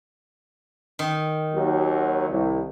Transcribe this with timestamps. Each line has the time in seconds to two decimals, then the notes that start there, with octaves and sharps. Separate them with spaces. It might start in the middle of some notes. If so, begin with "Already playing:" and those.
0.99 D#3
1.54 D#2 F#3
2.30 C2